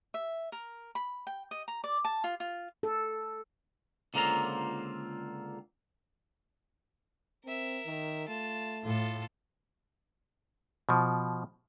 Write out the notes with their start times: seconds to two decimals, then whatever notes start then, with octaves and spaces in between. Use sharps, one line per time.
0.14 E5
0.52 A#4
0.95 B5
1.27 G5
1.51 D#5
1.68 A#5
1.84 D5
2.05 A5
2.24 F4
2.40 F4
2.83 A4
4.14 C#2 D3 A#3 C4 F4 A#5
7.45 C4 A#4 E5
7.86 D#3
8.28 A3 F4 A5
8.83 A2 F4 A4
10.89 B2 F3